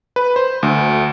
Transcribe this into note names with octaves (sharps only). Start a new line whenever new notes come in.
B4
C5
D2